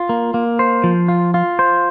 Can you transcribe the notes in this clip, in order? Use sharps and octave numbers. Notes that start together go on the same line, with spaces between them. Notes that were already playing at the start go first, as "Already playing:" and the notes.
Already playing: F4
A#3
A#3
C5
F3
F4
F4
C5